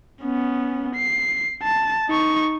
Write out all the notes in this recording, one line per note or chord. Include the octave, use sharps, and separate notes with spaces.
B3 C#4
C7
A5
D#4 C#6